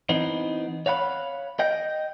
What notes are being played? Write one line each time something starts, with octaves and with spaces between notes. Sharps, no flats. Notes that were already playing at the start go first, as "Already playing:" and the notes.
E3 B3 C4 D#4
C#5 F5 F#5 B5
D#5 G5